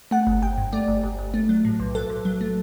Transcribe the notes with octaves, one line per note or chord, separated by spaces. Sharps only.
A3 F#5
G1
G1 G5
G2
A3 D5
G1
G1
G1
A3
F#3
A2
B1
F#3 A4
B1
F#3
A3